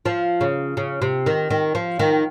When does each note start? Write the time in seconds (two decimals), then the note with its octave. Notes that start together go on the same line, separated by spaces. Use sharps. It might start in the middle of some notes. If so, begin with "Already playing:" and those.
0.06 F3
0.41 C#3
0.77 C#3
1.02 C3
1.26 D#3
1.51 D#3
1.75 F3
1.99 D#3